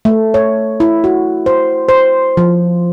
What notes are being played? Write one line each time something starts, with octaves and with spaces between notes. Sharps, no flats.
A3
C#5
E4
F#4
C5
C5
F3